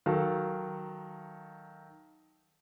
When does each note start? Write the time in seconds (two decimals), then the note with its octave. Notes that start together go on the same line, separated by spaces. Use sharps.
0.06 D#3 F#3 A4 F5 A5